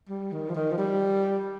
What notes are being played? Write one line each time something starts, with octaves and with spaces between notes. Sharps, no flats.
G3
D#3
F3
D#3
F3
G3